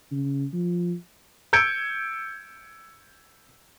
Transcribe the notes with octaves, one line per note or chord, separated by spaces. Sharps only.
C#3
F3
E6 G6 G#6 C#7 D7